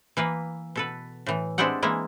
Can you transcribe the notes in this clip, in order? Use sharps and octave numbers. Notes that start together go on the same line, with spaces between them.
E3 A#3 B4
B2 A4 B4
A2 E3
G#3 C4 D4 E4 G4 F#5
E3 G#3 A#3 E4